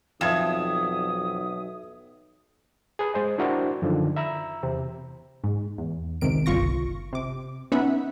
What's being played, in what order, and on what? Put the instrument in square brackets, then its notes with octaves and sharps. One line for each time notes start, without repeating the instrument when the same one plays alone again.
[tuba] B1 [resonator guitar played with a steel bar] F2 [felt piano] E5 G#6 E7 [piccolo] D#6
[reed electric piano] G#4 B4
G#3 C5 D#5
D4 E4 F#4 A#4 C5 G5
F#2 D3 D#3 F3
E5 A#5 B5 E6
E2 C3 C4
[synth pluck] G#2
E2
G#1 C#2 C3 D#3 D7
G1 C2 F4 C#6 A#6
C3 D6
B3 C#4 D#4 E5 F#5 B5